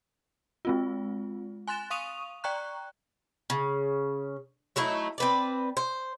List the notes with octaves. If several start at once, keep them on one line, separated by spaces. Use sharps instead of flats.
G#3 C4 F4
G#5 C6 F#6 A6 E7
F5 C#6 D#6 D#7 F7
D5 G5 A#5 C#6 F#6
C#3
F#3 A3 D#4 E4
C4 B4 D5
C5